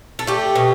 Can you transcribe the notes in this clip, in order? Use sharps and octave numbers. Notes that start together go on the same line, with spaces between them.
A4
A3 G4
B2